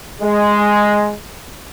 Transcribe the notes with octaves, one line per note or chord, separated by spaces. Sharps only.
G#3